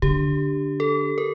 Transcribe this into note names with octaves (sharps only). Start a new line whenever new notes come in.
D3 G4
A4
A#4